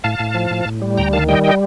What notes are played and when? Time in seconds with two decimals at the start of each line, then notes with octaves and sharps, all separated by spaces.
0.04 A2 F5 A5
0.19 A2
0.34 F3
0.51 A2
0.66 A2
0.82 G3
0.97 D2 G5 A#5
1.13 D#3 F5 A5
1.28 G3 D#5 G5
1.44 D#5 G5